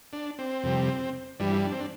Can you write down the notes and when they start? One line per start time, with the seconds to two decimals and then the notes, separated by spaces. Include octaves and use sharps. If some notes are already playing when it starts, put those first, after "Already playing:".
0.13 D4
0.39 C4
0.63 F2 C3 G3
1.40 G2 E3 G3 D4
1.65 D4
1.72 C4
1.80 D4